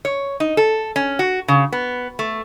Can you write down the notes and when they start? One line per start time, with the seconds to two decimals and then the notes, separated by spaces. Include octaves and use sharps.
0.05 C#5
0.40 D#4
0.57 A4
0.96 C#4
1.19 F#4
1.48 C#3
1.72 B3
2.19 A3